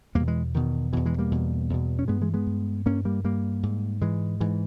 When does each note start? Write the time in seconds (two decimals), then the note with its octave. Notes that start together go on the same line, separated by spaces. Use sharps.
0.15 E2 B2 G3 A#3
0.28 E3 G#3
0.54 E2 B2 D#3
0.93 E2 B2 E3
1.06 E3 G#3
1.18 G3 A#3
1.31 E2 B2
1.69 E2 B2
1.99 C#4
2.08 G2 G#3 B3
2.21 E3 G#3
2.34 G#3 B3
2.47 G2
2.86 G2 A#3 C#4
3.05 G3 A#3
3.24 G2 G3 A#3
3.63 G#2
4.01 G#2 E3 G#3
4.40 G#2 E3